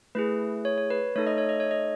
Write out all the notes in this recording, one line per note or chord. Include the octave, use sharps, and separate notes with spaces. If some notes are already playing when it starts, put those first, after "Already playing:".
A3 E4 G#4 B4
C#5
C#5
B4
A3 D#4 A4 C#5
D#5
C#5
D#5
C#5
D#5